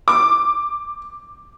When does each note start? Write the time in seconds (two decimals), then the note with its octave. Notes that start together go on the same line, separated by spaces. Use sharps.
0.08 D6